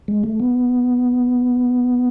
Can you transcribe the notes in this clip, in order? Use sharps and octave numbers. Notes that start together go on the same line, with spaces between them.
G#3
A3
B3